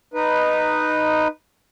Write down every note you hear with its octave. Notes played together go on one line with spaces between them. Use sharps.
D#4 B4